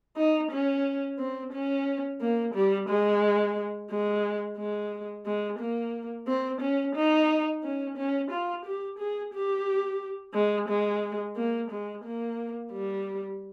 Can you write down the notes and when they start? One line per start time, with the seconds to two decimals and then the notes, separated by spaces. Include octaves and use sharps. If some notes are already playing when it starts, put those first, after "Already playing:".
0.17 D#4
0.51 C#4
1.19 C4
1.52 C#4
2.21 A#3
2.54 G3
2.89 G#3
3.90 G#3
4.57 G#3
5.26 G#3
5.59 A#3
6.27 C4
6.61 C#4
6.96 D#4
7.64 C#4
7.97 C#4
8.31 F4
8.65 G4
8.98 G#4
9.33 G4
10.34 G#3
10.69 G#3
11.36 A#3
11.71 G#3
12.04 A#3
12.72 G3